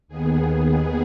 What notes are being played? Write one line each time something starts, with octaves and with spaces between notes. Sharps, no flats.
D#2 D#3 B3 G#4